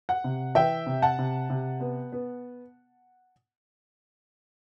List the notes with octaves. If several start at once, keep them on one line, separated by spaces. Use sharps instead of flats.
F#5
C3
E3 E5 G5
C3
F#5 A5
C3
C3
B3
B3